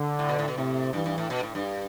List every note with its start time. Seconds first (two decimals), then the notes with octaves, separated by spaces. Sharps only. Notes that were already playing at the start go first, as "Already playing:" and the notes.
Already playing: D3
0.19 A2
0.29 B2
0.39 A2
0.48 B2
0.57 A2 C3
0.93 G2 E3
1.06 G2
1.18 A2
1.30 B2
1.43 A2
1.55 G2